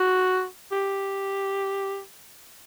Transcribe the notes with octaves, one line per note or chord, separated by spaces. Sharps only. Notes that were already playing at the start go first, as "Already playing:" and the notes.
Already playing: F#4
G4